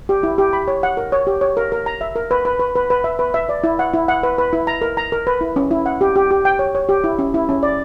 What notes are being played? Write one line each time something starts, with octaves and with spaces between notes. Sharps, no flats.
G4
E4
G4
B5
C#5
F#5
A#4
C#5
G4
C#5
A#4
A#4
A#5
E5
A#4
B4
B4
B4
B4
B4
E5
B4
E5
D5
E4
F#5
E4
F#5
B4
B4
E4
A#5
A#4
A#5
A#4
B4
E4
C#4
E4
F#5
G4
G4
G4
G5
C#5
C#5
G4
E4
C#4
E4
C#4
D5